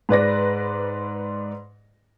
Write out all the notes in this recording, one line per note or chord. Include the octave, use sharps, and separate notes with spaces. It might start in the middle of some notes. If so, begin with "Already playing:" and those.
G#2 B4 D5 A#6